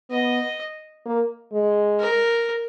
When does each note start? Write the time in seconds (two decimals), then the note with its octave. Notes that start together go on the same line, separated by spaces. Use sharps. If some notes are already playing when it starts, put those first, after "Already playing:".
0.11 B3 D#5
1.05 A#3
1.53 G#3
2.00 A#4